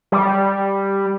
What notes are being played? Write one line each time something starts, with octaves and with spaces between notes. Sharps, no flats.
G3